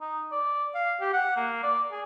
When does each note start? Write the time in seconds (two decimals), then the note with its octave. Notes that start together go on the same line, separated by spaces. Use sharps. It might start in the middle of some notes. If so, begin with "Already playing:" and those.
0.01 D#4
0.32 D5
0.75 F5
1.01 G4
1.13 F#5
1.37 A#3
1.63 D5
1.91 G#4